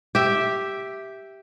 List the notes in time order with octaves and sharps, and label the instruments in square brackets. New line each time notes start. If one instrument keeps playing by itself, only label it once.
[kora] G4 E5